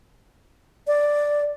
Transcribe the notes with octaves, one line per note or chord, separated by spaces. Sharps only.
D5